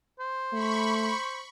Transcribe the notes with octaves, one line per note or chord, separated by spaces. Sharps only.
C5
A3 B5 C#6